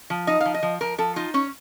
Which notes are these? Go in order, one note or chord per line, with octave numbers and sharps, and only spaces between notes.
F3
D#4 D#5
F3 F5
D#5
F3
F3 A#4
F3 A4
D#4 F4
C#4 C#5